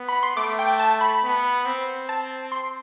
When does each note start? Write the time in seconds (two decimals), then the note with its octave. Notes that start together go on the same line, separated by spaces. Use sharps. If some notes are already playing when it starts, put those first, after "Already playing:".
Already playing: B3
0.09 B5
0.23 C6
0.36 A3 D6
0.59 G5
0.79 A5
1.01 B5
1.23 B3
1.65 C4
2.09 A5
2.52 C6